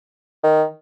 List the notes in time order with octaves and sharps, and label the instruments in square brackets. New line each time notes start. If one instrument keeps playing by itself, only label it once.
[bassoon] D#3